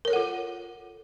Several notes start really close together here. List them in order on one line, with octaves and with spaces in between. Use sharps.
A#4 C#5 A4 F#5 F4